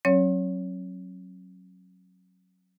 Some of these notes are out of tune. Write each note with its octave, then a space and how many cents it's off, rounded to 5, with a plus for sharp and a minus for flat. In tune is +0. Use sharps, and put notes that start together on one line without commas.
F#3 +0 C#4 -40 C#5 +20